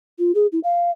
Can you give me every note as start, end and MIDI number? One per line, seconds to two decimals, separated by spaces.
0.19 0.32 65
0.35 0.47 68
0.52 0.59 64
0.64 0.91 77